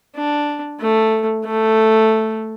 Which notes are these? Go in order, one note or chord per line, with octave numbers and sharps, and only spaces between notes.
D4
A3
A3